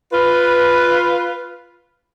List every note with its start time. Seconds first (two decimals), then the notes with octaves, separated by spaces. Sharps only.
0.13 F4 B4